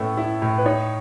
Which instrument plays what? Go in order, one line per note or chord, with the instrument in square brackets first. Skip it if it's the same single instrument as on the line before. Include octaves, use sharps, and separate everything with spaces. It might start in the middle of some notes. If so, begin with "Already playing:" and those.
Already playing: [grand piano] A2 B3 C#4 [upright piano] A4
[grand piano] E4
A2
[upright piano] B4
[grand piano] D#4 [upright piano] C#5